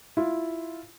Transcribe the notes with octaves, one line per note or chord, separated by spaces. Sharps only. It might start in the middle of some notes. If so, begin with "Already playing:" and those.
E4 F4